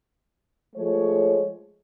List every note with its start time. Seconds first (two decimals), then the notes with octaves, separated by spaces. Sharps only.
0.76 F3 G#3 A3 C#5